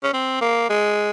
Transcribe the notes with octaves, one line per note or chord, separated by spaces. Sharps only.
C#4
C4
A#3
G#3